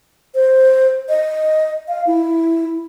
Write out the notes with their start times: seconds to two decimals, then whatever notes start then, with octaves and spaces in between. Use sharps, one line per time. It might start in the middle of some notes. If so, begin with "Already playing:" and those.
0.35 C5
1.09 D#5
1.88 F5
2.07 E4